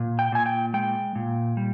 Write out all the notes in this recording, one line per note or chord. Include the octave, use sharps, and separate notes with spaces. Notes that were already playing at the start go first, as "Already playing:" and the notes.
Already playing: A#2
G5
A#2 G#5
G5
G#3 G5
A#2
G3